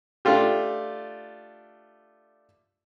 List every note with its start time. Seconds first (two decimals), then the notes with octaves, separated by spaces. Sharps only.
0.25 A3 D4 F4 G4